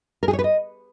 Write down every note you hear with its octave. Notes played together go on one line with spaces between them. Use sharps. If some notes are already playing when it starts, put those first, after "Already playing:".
A#4
G#4
C#5
B4
D#5